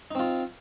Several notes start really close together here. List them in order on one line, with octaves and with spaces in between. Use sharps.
D#4 C4 F4